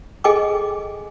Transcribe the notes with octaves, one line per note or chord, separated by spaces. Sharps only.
G#4 A4 D#5 G5 G#5 D6